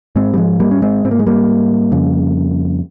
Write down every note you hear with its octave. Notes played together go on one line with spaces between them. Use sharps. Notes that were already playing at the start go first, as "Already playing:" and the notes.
G#2 G#3 C4
G3
F3 G#3
G3 A#3
C#4
G#3 C4
G#2 C4
A#3
G#3
G3 A#3
F2 C#3